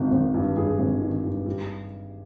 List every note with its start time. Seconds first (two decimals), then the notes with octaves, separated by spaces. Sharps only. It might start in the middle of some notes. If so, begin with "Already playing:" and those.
Already playing: G#1 D#3
0.11 G#1
0.34 G2
0.56 G2 G#4
0.79 G#1
1.01 D#3
1.24 G2
1.46 G3